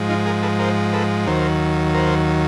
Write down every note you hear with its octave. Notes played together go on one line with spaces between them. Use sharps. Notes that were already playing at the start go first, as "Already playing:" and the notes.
Already playing: G#2 F3 G#3
D#4 F4
G#4 A#4
A4 B4
A#4 C5
A4 B4
D#2 D#3 F#3 A#4 C5
A#4 C5